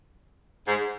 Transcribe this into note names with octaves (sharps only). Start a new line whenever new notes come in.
G#2